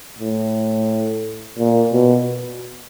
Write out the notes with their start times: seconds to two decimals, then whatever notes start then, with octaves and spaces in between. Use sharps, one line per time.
0.19 A2
1.59 A#2
1.93 B2